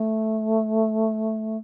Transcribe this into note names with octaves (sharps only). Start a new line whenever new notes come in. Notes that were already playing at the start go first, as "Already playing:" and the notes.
Already playing: A3